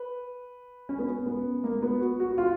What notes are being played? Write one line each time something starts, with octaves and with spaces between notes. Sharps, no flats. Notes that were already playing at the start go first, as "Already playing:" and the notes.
Already playing: B4
C#4
B3
C#4
B3
A#3
A#3
B3
F#4
F#4
F#4
F4